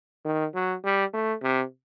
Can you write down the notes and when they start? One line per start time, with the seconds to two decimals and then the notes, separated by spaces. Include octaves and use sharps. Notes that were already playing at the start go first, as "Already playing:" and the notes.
0.25 D#3
0.54 F#3
0.84 G3
1.14 A3
1.43 C3